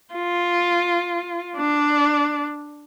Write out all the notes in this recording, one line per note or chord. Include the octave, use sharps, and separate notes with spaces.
F4
D4